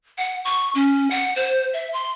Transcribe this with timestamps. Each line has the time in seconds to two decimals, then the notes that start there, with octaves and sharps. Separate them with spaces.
0.18 F#5
0.45 C#6
0.75 C#4
1.11 F#5
1.36 C5
1.73 E5
1.93 C6